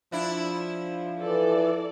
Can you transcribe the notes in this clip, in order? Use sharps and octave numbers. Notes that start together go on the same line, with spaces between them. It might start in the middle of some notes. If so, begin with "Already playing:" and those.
F3 D4 E4
E3 A4 D5